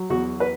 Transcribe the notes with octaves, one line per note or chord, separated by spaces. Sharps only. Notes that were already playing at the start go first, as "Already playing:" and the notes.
Already playing: F#3
E2 F#4
B4